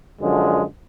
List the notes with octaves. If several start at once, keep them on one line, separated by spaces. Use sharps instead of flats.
F#2 D3 F3 G#3